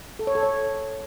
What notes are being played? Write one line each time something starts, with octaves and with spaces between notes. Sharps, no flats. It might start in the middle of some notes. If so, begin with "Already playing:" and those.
A4
C#5
A4
C#5